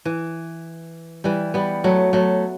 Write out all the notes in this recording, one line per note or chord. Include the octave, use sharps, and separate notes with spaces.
E3
E3 G3
G3 B3
F#3 A3
F#3 A3